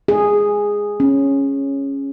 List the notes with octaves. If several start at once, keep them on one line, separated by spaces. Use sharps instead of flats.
G#4
C#4